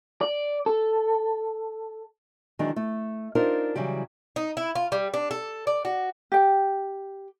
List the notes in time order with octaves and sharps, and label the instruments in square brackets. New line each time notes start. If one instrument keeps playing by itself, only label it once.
[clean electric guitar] D5
A4
[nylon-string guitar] D#3 E3 F#3 G#3 D4
A3
D4 D#4 F4 A#4 C5 F5
C#3 E3 F#3 G3 G4
[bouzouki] D#4
E4
F4
G3
D4
A4
D5
F#4
[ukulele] G4 G5